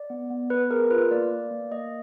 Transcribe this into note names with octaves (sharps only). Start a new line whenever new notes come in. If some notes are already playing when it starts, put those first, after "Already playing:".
Already playing: D5
B3
B3
B3 B4
G#4 A#4
F4 B4
A#3 D5
A#3
A#3
A#3 D#5